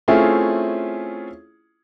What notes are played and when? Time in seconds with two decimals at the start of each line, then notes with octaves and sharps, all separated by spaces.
0.08 A3 C4 C#4 E4 F4 G#4